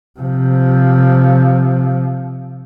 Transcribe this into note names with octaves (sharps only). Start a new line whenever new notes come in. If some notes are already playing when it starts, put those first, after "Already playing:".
C3 F3